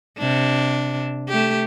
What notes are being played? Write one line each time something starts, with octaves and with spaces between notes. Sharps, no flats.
C3 D4
A3 G4